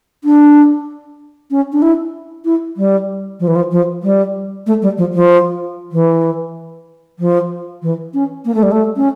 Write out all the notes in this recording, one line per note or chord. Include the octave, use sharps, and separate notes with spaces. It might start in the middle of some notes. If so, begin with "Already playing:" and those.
D4
C#4
D4
E4
E4
G3
F3
E3
F3
F3
G3
A3
G3
F3
F3
E3
F3
E3
C#4
A#3
A3
G3
A3
C#4